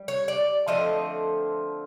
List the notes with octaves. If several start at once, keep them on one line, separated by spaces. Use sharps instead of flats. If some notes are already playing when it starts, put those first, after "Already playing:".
Already playing: G3
C#5
D5
D3 F3 A3 C4 D#5